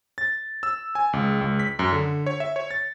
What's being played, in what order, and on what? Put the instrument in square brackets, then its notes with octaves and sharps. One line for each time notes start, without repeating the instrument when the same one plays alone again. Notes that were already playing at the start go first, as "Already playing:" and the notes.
[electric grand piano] A6
E6
G#5
C#2
C#2
B6
F#2
D3
C#5
E5
C#5
A6